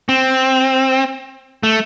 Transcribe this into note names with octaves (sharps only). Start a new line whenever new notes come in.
C4
A3